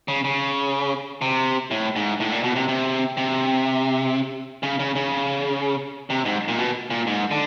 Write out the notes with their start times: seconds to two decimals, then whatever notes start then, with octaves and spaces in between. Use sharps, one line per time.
0.08 C#3
0.24 C#3
1.22 C3
1.71 A2
1.96 G#2
2.20 A2
2.32 A#2
2.44 B2
2.56 C3
2.68 C3
3.17 C3
4.63 C#3
4.79 C#3
4.95 C#3
6.10 C3
6.25 G#2
6.48 A#2
6.58 B2
6.90 A#2
7.07 G#2
7.31 D3